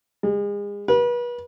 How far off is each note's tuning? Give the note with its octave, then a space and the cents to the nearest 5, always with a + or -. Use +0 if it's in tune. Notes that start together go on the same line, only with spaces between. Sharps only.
G#3 -35
B4 -35